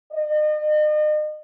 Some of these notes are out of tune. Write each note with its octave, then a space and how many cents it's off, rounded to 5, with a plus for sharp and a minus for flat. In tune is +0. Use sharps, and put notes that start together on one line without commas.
D#5 -40